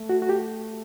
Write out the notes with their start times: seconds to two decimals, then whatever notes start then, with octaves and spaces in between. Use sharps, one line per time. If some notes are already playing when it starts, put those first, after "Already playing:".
Already playing: A3
0.09 F#4
0.22 F#4
0.29 G4